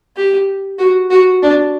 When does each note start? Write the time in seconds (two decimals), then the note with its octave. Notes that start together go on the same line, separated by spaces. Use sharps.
0.17 G4
0.79 F#4
1.11 F#4
1.42 D4